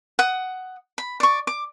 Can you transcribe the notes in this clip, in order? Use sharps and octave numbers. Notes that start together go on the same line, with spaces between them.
F#5 D#6
B5
D5 C#6
D6